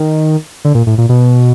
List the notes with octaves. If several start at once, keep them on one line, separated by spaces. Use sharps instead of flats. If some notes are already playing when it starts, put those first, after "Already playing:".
Already playing: D#3
D3
A#2
A2
A#2
B2